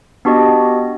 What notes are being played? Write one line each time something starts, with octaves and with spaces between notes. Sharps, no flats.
B3 D4 F#4 G4 D#5